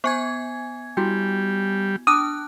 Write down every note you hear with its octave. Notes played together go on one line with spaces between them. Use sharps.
B3 C5 G#5 C#6 G#6
G3 E4 F#4 G5
D4 A5 D6 D#6 F#6